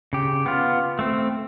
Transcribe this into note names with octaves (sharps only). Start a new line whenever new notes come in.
C#3 G4
B3 F4
A3 C4